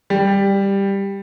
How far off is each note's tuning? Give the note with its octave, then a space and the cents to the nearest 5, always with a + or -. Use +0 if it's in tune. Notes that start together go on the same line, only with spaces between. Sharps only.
G3 +10